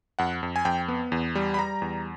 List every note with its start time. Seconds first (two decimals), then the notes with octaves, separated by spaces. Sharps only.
0.19 F2 F#5
0.43 F2
0.56 G#5
0.65 F2 G5
0.88 B3
1.12 E2
1.35 G3
1.54 B5
1.59 G3 A#5
1.82 E2